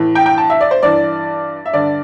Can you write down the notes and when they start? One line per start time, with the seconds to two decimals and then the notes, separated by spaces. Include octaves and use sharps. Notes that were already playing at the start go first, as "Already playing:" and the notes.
Already playing: A2 E3
0.15 G5
0.26 G5
0.38 A5
0.50 E5
0.61 D5
0.71 C5
0.83 G2 E3 D5
1.66 E5
1.73 G2 D3 D5